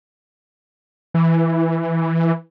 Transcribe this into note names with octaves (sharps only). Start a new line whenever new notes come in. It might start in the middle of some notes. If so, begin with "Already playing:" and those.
E3